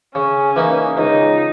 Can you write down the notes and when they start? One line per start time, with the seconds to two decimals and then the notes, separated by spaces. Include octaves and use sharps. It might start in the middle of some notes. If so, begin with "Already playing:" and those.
0.15 C#3 C#4
0.56 E3 A#3 D#4
0.97 C#2 D#4